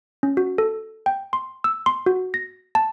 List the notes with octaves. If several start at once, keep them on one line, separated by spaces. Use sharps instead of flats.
C#4
F#4
A4
G5
C6
E6
C6
F#4
A#6
A5